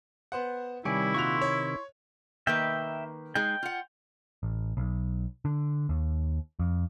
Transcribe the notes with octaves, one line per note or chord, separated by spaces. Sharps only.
B3 C5 F#5
C3 D#3 G3 E4 C#5 D5 G#5
A#2 F#4 C6 C#6 F7
C#5
D#3 A#3 B4 E5 G5
G#3 D#4 G#4 G5
F4 F#5
A1
B1
D3
D#2
F2